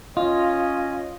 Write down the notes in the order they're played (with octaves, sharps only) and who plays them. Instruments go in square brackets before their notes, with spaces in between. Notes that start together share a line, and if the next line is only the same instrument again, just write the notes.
[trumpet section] C#4 D#5 [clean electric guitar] F4